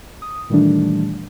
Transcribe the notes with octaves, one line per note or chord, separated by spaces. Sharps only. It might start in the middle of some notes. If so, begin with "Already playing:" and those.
D#6
A#2 D#3 E3 G3 A3 D4